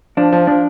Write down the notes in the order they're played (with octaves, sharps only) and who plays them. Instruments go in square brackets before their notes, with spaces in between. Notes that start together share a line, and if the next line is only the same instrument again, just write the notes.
[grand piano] F3 [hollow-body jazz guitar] D4
[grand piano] F3
[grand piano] F3 [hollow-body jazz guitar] D4